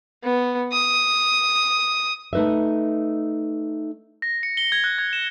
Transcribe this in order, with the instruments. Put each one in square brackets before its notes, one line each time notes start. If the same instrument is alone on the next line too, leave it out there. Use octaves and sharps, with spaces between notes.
[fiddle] B3
D#6
[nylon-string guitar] A3 D#4 B4 D#5 E5
[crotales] A#6
C#7
G7
G#6
F#6
G#6
E7